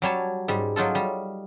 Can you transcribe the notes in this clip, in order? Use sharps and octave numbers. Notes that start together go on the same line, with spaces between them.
F#3 G3 C#5 A5
G#2 G3
F#3 D#4 F4 A4
G3